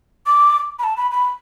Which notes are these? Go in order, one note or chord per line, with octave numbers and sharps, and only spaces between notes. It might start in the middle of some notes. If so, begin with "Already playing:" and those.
D6
B5
A5
B5
B5